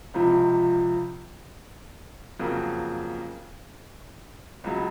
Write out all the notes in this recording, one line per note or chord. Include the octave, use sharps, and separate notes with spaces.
C#2 C3 F3
F2 C#3 F#3 A#3
C#2 C#3 F#3